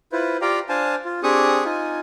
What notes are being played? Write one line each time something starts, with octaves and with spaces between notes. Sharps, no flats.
E4 F4 B4 C5
F4 G4 D5 F5 G5 A#5
D4 C5 F5 G#5 A5
F4
C4 D4 G4 G#4 C#6 D#6
D#4 F4 G#5